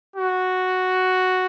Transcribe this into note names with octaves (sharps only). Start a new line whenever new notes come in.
F#4